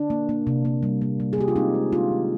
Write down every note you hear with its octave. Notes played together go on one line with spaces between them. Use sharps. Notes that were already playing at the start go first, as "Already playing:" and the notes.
Already playing: D4
A#3
A#3
C3
A#3
G3
A#3
G3
G#4
A#3 G4
F4
G#3 C4 D#4
G#3
G#3 D4 F4
D#3